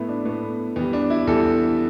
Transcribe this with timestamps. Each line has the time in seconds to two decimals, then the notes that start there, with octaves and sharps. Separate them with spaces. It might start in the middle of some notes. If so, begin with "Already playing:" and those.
Already playing: A2 A3 B3 E4
0.09 D4
0.25 A2 A3 B3
0.76 E2 E3 G3 B3
0.93 D4
1.10 E4
1.27 E2 E3 G3 A4